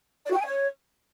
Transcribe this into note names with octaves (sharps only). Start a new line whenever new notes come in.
D5
F#4
G5
G#5
C#5